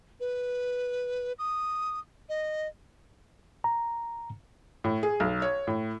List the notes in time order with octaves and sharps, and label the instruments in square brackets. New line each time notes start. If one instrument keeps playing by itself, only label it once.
[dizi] B4
D#6
D#5
[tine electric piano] A#5
[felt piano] A2
G#4
B1
C#5
A2